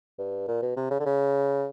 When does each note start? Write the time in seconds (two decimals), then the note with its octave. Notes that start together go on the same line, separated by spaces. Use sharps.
0.18 G2
0.48 A#2
0.62 B2
0.76 C3
0.91 C#3
1.00 D3
1.05 C#3